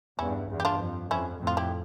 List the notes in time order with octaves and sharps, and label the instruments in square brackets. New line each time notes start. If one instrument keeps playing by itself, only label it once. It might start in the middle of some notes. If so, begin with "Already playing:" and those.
[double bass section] E2 G2 [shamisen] C#4 E4
[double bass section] E2 G2
[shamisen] G4
D4 F4
[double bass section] F2
[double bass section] F2 [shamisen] C#4 E4
[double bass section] F2 A2
[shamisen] F4
E4 G4